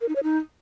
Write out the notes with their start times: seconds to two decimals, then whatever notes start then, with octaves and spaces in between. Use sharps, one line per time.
0.01 A#4
0.08 D#4
0.16 C#5
0.23 D#4